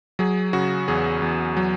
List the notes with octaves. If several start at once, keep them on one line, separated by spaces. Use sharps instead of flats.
F#3 G#4
C#3 F#4
E2 G#4
E2
F#3